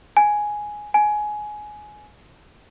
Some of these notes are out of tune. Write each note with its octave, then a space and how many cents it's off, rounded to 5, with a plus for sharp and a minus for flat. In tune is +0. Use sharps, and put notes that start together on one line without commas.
G#5 +5
G#5 +15